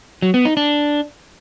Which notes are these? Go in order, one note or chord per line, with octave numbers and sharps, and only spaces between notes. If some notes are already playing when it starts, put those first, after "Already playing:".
F#3
B3
D#4
D4